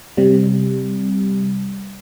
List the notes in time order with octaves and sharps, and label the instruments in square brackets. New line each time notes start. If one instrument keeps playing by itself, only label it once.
[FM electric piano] C3 G3